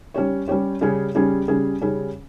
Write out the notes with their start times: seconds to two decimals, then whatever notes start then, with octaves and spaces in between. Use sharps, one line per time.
0.14 G3 C#4 G4 C#5
0.48 G3 C#4 G4 C#5
0.81 C#3 G3 C#4 G#4
1.15 C#3 G3 C#4 G#4
1.48 C#3 G3 C#4 G#4
1.81 C#3 G3 C#4 G#4